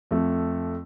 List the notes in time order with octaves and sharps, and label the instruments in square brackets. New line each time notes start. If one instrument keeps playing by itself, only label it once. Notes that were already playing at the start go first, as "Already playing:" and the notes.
[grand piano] F2 A3